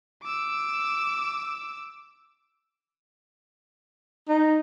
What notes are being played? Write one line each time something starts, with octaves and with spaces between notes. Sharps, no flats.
D6 E6
D#4